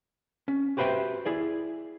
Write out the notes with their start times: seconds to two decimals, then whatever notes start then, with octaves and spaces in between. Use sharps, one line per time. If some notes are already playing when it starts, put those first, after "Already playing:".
0.48 C#4
0.77 F#4 G4 B4 C5 E5 G5
1.26 E4 G#4 D5